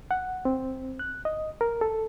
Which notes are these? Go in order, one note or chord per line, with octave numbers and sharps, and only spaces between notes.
F#5
C4
F#6
D#5
A#4
A4